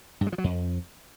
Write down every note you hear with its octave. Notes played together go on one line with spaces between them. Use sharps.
G2
G#3
F3
F#3
F2